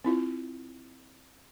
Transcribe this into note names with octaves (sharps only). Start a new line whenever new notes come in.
C4 E4 F4